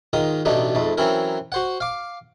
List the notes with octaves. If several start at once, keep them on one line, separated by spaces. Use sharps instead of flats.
G#2 D#3 F4 D#6
A1 B2 A3 D4 D#4
F2 G#2 A3
E3 F#3 C4 C#4 E4 A#4
F#4 C5 F#5
F5 D6